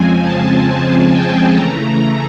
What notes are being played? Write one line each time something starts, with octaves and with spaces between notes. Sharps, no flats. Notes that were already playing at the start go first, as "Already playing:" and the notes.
Already playing: F2 C#3 F3 G#3 C4 G#5
A5
A5
G5
C#3 E3 A3 A#5